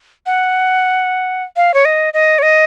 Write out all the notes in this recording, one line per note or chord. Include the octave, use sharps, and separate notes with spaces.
F#5
F5
C#5
D#5
D#5
C#5
D#5